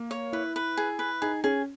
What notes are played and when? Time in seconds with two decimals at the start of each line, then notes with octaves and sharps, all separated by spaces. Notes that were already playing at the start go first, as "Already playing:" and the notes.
Already playing: A#3
0.11 C#5
0.33 E4 B4
0.56 B4
0.77 G#4
0.99 B4
1.22 D#4 G#4
1.44 C#4 G#4